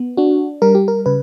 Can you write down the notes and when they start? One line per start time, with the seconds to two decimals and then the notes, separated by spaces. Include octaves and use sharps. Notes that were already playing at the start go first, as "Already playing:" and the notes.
Already playing: B3
0.17 D4 F#4
0.62 G3 A#4
0.75 G4
0.88 A#4
1.06 C#3 B4